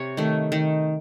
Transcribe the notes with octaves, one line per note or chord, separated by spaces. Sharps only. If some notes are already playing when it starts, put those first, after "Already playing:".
Already playing: C3 C#5
D#3 A3
D#3